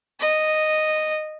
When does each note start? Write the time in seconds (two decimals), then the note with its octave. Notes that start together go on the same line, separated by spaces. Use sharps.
0.20 D#5